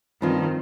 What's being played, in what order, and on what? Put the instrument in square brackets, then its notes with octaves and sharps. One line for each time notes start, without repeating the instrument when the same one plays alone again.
[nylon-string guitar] G2 F3 C4 F4 [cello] D#3